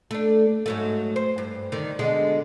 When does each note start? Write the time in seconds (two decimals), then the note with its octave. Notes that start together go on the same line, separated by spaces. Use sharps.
0.11 A3 D4
0.66 G#2 F#3 A3
1.16 C5
1.38 G2
1.72 D3 D#3
1.99 B2 D3 G#3